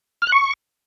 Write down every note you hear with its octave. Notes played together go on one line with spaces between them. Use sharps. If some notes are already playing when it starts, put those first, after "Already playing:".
F6
F#6
C#6